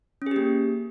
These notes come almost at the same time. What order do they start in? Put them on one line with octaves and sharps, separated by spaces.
C#4 G#4 G4 A#3